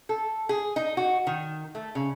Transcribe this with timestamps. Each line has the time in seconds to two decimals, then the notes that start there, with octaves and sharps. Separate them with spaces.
0.09 A4
0.49 G#4
0.76 D#4
0.97 F#4
1.27 D#3
1.75 A3
1.95 C#3